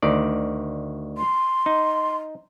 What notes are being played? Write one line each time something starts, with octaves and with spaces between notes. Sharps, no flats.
D2 D#3 D5
C6
D#4